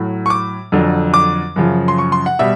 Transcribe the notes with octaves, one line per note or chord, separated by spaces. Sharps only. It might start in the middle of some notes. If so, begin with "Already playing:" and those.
Already playing: A2 F#3
C#6
D6
F2 D3 F#3
D6
F#2 C#3 F3
C6
C#6
C6
F#5
B2 G3 E5